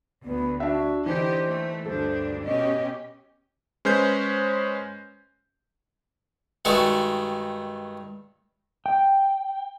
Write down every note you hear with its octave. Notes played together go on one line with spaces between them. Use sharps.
D2 B3
D4 F#4 E5
D3 E3 D#4 G4 C5
A3
D2 G2 D4 A4 C5
B2 C#4 G4 D#5
G#3 C#4 B4 C5 G6
G2 D#3 G#3 A3 F#4
G5